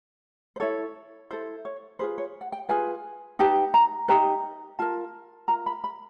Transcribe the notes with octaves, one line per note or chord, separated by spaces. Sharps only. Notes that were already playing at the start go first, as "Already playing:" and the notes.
C5
E4 A4 C#5
E4 A4 C5
C#5
F4 G#4 B4 C5
C#5
F#5
G5
F4 G#4 B4 G#5
D#4 G4 B4 A5
A#5
D#4 G4 B4 A#5
F4 A#4 A5
F4 A#4 A#5
B5
B5